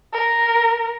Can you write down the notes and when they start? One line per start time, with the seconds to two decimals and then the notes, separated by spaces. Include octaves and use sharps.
0.13 A#4